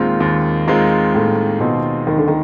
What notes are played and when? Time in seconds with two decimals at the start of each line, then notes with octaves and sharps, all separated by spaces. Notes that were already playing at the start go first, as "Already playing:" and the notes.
Already playing: D#2 A#2 D#3 G#3 C4 F4
0.20 D#2
0.67 D#3 G#3 C4 F4
1.14 D#2 A2
1.60 B2 D#3 G#3 C4 F4
2.07 D#2 D#3
2.17 D3
2.28 D#3